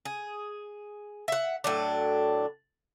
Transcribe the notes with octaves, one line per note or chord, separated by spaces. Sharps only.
G#4
E5 F#5
A2 F#3 D4